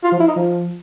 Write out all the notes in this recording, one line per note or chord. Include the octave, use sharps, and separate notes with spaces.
F4
F3
E4
D#4
F3